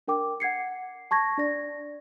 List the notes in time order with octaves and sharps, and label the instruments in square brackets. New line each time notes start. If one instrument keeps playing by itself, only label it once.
[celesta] D4 A#4 G5 D6
F#5 G#6 C7 C#7
A5 C#6 G#6 A#6
D4 D5 A#6